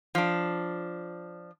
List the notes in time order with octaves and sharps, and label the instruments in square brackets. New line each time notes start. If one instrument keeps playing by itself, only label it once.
[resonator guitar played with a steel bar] F3 D4